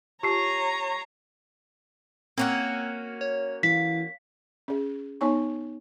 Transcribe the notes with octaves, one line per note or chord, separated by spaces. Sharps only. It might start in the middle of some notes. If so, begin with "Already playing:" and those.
F4 G4 C#5 A5 A#5 C#6 C7
A#3 C4 C#4 F#4
C#5
E3 F5 B6
C#4 G#4
B3 D#4 C#5 G#5 C#6